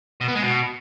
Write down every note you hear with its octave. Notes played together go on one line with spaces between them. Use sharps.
B2
B3
G#3
B2